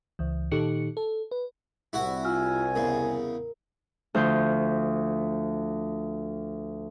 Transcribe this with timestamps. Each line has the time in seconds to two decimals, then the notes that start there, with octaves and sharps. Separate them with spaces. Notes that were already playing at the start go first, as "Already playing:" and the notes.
0.19 C#2 E3
0.51 A#2 D#3 D#4 G4 A4 C#7
0.97 A4
1.31 B4
1.93 C2 E4 F#4 F#5
2.25 F4 G#5 E6 F6
2.75 E2 C#3 A#4
4.14 D2 F3 C5 G6